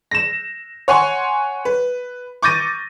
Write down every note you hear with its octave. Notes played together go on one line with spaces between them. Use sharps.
A#6 E7
C#5 F#5 G#5 C6 C#6
B4
C#6 D6 G6 A6 A#6 D#7